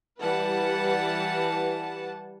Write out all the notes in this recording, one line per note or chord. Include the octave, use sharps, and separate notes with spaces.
E3 G3 B4 F#5 A5